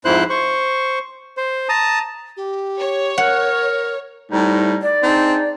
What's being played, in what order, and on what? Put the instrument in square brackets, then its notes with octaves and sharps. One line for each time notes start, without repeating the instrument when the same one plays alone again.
[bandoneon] F2 G#2 E4 C5 F#6
C5 C#6
C5
A5 A#5 D#6
[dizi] G4
[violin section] C#5
[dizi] A#4 [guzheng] F#5
[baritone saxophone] A2 [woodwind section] C3 G3 D#4
[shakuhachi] D5
[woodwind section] G#3 D4 D#4 [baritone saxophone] C4